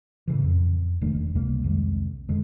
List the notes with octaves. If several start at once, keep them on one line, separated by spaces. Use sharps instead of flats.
A2 C#3 E3
F2
E1 D#3 A3 D4
C#2 C3 G3 A#3
C2 F2 D#3 G#3
F#2 D3 G#3